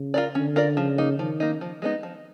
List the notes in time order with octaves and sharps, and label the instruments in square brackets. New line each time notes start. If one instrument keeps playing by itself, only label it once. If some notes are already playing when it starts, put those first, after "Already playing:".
Already playing: [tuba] C#3
[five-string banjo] F4 A#4 D5
[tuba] D3 [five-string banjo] C#4
[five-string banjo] F4 A#4 D5
[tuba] C#3 [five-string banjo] F3
[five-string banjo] A#3 D#4
[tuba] D#3 [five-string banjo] F3
[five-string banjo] A#3 D#4
F3
G#3 B3 D#4
F3